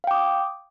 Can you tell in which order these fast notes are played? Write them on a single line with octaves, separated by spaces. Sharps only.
F5 G5 D6 D#6